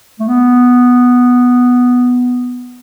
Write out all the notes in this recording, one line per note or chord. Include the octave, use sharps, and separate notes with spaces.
A3
B3